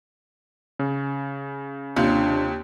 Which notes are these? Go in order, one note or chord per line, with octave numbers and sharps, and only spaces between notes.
C#3
D#2 C3 D4 F4